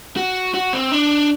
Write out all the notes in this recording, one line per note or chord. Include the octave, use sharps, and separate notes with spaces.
F#4
F#4
C4
D4